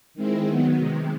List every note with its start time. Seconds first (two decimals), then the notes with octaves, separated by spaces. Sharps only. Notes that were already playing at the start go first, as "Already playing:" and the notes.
0.14 D#3 G#3 C4 E4
0.47 D#3 F#3 B3
0.78 C3 D#3 G#3